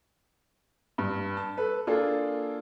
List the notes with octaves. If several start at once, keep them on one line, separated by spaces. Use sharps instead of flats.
G2
A5
A4 B4
A#3 D4 F4 G#4 A4